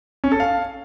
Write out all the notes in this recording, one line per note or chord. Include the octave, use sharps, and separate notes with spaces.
C#4
A4
F5